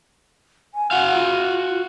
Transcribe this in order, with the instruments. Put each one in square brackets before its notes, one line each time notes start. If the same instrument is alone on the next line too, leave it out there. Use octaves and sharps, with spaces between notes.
[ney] G#5
[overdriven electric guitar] F#4 F5 [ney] F#5
[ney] F4